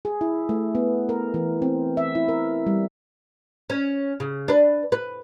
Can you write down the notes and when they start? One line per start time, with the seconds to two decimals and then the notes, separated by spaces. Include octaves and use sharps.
0.05 G#4
0.21 E4
0.49 A3
0.75 B3
1.09 A#4
1.34 E3
1.62 C4
1.97 E5
2.15 E4
2.29 A#4
2.67 G3
3.70 C#4
4.20 C#3
4.48 D4 B4
4.92 B4